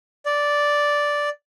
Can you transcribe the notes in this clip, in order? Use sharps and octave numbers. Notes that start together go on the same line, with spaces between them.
D5